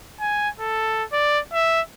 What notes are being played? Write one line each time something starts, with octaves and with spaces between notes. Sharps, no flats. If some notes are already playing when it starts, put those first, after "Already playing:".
G#5
A4
D5
E5